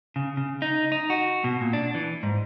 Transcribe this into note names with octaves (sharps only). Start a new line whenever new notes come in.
C#3
C#3
D#4
D#4
F#4
B2
A#2
D4
E3
G#2